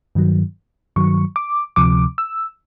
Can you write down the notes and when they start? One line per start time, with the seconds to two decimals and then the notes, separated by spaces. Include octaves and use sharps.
0.15 G2 D#3 F#3
0.96 G2 D#3 F#3 C#6
1.36 D6
1.76 D2 C3 F3 D6
2.18 E6